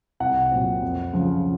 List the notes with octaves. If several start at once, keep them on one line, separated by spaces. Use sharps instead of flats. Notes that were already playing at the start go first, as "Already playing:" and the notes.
C2 F#5
A#2 F#3 C4
F2
C#3 F3